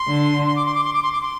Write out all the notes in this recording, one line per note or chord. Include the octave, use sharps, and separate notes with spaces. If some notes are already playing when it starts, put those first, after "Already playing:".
Already playing: C6
D3
C6
D6
C6
D6
C6
D6
C6
D6
C6